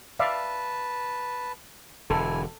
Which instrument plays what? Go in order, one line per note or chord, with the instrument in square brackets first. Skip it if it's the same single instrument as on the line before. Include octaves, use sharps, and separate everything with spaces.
[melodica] B4 A5 [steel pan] D5 E5 F5
[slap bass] E1 D3 [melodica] E4 G#5 [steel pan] A4